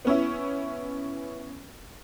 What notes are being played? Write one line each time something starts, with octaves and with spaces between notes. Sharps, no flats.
B3 C#4 E4